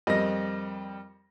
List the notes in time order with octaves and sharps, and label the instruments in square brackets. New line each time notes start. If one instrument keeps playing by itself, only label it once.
[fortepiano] F2 A#3 D#5 [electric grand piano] G3 A#6